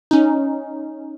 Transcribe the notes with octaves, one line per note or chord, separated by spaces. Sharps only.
C#4 D#4